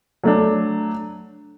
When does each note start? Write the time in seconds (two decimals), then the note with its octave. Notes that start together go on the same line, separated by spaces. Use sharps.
0.24 F#3 A3 D4